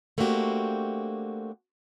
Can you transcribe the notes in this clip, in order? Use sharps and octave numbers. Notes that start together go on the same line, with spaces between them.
A3 A#3 C4 D4 F#4 G4